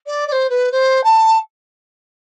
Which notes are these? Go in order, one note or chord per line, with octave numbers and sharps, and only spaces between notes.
D5
D5
C5
B4
C5
A5